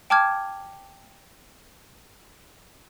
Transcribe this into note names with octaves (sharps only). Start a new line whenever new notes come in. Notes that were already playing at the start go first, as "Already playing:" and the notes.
G5 A5 D6 F6 G#6